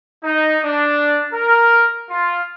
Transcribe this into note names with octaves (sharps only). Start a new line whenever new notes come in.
D#4
D4
A#4
F4